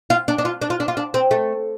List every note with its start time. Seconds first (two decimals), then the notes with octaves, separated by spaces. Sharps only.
0.10 F4
0.28 D4
0.38 D4
0.45 F4
0.62 D4
0.70 F4
0.80 D4
0.88 F4
0.97 D4
1.14 C4
1.31 A3